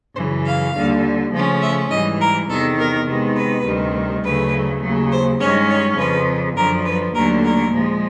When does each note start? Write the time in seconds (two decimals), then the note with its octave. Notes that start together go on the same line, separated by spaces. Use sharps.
0.16 F#2 C#3 E3 C5
0.45 F5
0.75 D#2 D3 G3
1.32 C#3 F3 A3 C#4
1.62 E5
1.90 G#2 E3 G3 D#5
2.20 A#4
2.49 E2 C3 D#3 A4
2.78 A#4
3.07 C3 D#3 G#3 B3
3.36 B4
3.65 D2 C3 D#3 G3
4.23 D2 C#3 F#3 A3 B4
4.82 D#2 C#3 F#3
5.11 C5
5.40 G2 D#3 G#3 C#4 C#5
5.70 C#5
5.98 F2 C#3 F3 B4
6.56 F#2 D3 F3 A#4
6.85 B4
7.14 D#2 D3 F#3 A3 A#4
7.44 A#4
7.73 A#2 F3 G#3